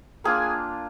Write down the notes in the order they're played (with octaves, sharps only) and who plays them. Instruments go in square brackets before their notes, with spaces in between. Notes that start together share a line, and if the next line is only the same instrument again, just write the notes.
[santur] A#3 D4 F4 G#4 G#5